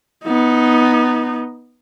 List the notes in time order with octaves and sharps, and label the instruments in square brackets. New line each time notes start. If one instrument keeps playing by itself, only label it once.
[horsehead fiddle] B3 D#4